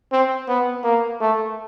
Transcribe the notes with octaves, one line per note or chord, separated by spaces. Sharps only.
C4
B3
A#3
A3